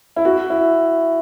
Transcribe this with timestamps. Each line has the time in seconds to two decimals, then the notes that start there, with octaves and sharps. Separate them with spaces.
0.16 E4
0.25 F#4
0.50 E4